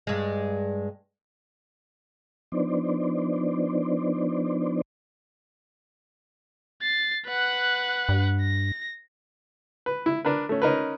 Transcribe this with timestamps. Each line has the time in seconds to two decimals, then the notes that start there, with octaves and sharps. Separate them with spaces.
0.07 G2 G#3
2.52 F3 B3 D4 D#4 C5 D5
6.82 A6 C7
7.26 B4 F#5
8.09 G2
8.41 A#6
9.86 B4
10.06 E4
10.25 D4 A#4 B4
10.49 A3 C#4
10.62 C#4 D#4 A#4 B4